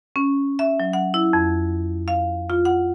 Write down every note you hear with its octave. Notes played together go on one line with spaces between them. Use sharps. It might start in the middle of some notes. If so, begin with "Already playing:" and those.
C#4
E5
F#3
F#5
E4
F2
F5
F4
F#5